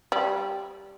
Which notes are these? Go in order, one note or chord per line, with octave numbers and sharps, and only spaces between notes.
G3